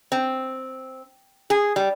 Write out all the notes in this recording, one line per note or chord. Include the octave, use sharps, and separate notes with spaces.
C4
G#4
G3